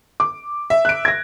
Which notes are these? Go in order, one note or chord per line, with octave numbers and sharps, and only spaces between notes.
D6
E5
F#6 D7
G#6 A#6